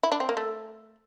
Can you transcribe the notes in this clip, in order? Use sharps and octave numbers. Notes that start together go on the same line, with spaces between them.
E4
D4
C4
A#3
A3